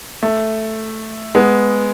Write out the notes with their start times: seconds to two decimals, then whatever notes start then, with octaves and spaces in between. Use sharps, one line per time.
0.23 A3
1.35 G#3 B3